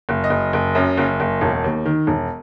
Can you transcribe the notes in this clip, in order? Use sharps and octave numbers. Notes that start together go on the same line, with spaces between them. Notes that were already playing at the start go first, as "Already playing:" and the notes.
F#1
D#5
F#1
F#1
F#2
F#1
F#1
E1
D#2
D#3
E1